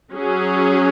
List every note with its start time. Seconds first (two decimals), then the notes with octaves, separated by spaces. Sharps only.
0.12 F#3 C#4 G#4 C#5